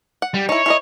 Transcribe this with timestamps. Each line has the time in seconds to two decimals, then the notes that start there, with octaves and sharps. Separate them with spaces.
0.22 F#5
0.34 G3
0.49 D#4 E4 C#5
0.66 E4 A#4 D#5